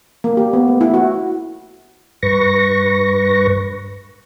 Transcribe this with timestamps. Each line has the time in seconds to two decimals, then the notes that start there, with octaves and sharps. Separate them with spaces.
0.24 A#3
0.37 G4
0.53 B3
0.68 A3
0.81 E4
0.94 F#4
2.23 G2 B4 C#6 A#6